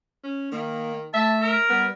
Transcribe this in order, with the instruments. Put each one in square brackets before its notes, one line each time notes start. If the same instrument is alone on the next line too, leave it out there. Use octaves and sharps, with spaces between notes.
[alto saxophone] C#4
[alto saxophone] D#3 [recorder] A#3
[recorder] A3 [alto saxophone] E5 [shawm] A5
[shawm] A#4
[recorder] G3 [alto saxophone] B3